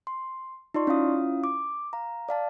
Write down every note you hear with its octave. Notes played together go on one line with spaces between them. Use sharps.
C6
D#4 F4 D5 C6 C#6
C#4 E4 F4 F5 D#6
D6
F5 A#5
D5 F5 A5